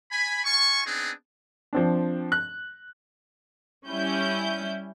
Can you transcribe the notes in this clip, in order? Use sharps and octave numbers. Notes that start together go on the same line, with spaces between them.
G#5 B5
F4 G#5 C#6
B3 C4 D4 D#4 G#4
F3 C4 D4
F#6
G3 C#4 E4 G6